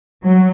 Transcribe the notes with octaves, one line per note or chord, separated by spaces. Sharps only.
F#3